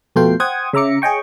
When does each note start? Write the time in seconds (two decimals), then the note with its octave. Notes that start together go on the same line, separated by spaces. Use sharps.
0.16 F2 B2 A3 F4 G5 C7
0.40 C5 F#5 G5 D#6 G#6
0.73 C#3 E5 A#5 D6 C#7
1.02 G#4 C#5 D#5 G5 C#6